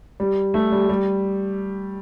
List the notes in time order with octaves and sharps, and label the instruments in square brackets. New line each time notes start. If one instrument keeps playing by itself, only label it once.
[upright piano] G3
A3
G3
G3